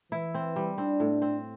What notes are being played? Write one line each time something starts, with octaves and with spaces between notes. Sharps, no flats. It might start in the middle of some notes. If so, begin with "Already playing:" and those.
E3 E4
C4
G3
C4 D4
A2
C4